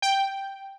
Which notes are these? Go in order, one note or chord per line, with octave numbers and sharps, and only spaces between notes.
G5